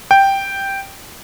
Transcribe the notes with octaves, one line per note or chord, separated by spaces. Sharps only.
G5